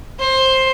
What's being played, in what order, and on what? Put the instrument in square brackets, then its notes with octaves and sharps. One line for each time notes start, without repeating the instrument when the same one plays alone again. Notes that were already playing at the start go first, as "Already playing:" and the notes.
[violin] C5